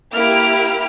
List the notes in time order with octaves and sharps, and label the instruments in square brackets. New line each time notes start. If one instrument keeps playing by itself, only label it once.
[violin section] A#3 E4 G4 F6 D7